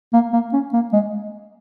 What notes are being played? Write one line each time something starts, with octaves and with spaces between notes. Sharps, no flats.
A#3
A#3
C#4
A#3
G#3